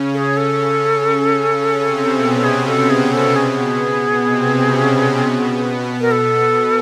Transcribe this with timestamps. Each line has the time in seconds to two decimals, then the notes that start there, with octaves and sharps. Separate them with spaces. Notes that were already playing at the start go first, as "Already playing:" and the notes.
Already playing: C#3 C#4
0.14 A4
0.18 G#4
0.37 A4
1.52 C#3 C#4
1.82 C3 C4
2.14 B2 B3
2.43 G#4
2.67 A4
2.90 G#4
3.13 A4
3.36 G#4
4.27 C3 C4
4.58 C#3 C#4
4.88 C3 C4
5.19 B2 B3
6.01 A#4
6.11 A4